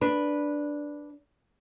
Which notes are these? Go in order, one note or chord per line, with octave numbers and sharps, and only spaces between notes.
D4 B4